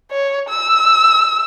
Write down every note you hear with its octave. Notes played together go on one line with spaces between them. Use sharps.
C#5
E6